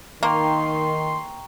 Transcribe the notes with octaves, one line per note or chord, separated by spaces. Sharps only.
D#3 A#3 G5 A#5 C6 C#6